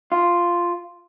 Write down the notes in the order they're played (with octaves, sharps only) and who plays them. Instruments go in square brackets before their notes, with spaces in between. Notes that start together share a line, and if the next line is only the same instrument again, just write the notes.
[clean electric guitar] F4